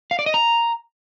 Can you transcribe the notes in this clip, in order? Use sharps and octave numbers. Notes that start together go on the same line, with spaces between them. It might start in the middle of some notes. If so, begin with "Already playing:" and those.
F5
D5
D#5
A#5